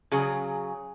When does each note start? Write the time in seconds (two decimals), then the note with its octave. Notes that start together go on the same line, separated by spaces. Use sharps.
0.12 C#3 F#3 G#4